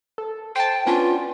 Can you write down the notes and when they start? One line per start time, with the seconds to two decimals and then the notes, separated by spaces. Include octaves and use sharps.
0.18 A4
0.56 C5 G5 A5
0.86 B3 C#4 D4 F4